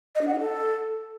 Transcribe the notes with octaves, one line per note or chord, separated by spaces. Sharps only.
D#5
D4
F#5
D#4
A4